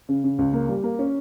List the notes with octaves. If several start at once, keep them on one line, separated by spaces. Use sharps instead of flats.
C#3
C#3
C#2
A#3
G3
A#3
C#4